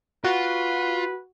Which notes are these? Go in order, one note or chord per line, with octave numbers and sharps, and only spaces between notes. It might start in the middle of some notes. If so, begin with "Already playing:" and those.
F4 F#4 B4